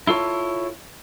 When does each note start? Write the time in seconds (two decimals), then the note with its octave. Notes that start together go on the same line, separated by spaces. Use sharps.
0.07 E4 F4 A4 C#5